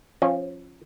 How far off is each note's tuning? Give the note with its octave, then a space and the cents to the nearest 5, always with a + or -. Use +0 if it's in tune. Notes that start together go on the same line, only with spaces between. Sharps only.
F3 +0 C#4 -25